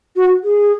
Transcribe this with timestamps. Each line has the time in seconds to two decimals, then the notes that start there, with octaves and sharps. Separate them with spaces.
0.16 F#4
0.44 G#4